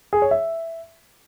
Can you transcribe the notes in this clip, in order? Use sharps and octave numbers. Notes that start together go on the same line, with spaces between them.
G#4
C#5
E5